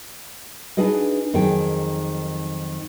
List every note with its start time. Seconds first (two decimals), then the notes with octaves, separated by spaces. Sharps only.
0.77 D4 D#4 F#4 G#4 B4 D#5
1.34 F2 D#3 F#3 G#4 G5